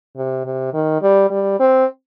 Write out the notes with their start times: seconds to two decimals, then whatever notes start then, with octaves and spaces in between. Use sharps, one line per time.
0.17 C3
0.46 C3
0.74 D#3
1.02 G3
1.30 G3
1.60 C4